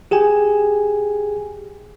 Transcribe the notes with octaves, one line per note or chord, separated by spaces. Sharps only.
G4 G#4 G5 G#5